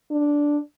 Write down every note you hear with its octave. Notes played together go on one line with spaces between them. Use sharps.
D4